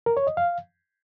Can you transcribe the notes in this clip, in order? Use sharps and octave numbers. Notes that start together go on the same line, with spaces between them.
A#4
C#5
D#5
F5